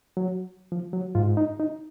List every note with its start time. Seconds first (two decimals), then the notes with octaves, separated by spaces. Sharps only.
0.17 F#3
0.72 F3
0.93 F#3
1.15 G#2 F4
1.37 D#4
1.60 D#4